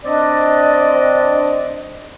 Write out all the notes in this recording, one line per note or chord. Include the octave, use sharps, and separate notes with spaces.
C4 D4 D5 D#5